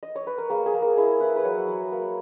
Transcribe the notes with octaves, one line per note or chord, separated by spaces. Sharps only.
D#5
C#5
B4
A#4
A#3 G#4
G#4
A#3
A#4
E4 G#4
E4 B4
B4
F#3 C#5
F#3
A#3